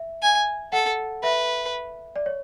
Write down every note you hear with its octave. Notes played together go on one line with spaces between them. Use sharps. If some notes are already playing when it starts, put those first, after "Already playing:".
Already playing: E5
G#5
A4 F#5
B4 E5
D5
C#5